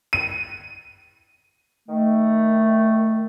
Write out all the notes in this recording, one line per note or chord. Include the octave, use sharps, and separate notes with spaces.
D#7
D#3 A3